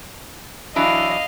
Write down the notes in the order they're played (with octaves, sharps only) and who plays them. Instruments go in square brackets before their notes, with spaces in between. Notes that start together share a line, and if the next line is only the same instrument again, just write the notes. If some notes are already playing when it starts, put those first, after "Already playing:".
[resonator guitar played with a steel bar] E3 F#3 D4 [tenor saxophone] E4 [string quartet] D#5 F5